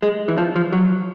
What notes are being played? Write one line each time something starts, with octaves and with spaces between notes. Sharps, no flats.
G#3
E3
F3
F3
F#3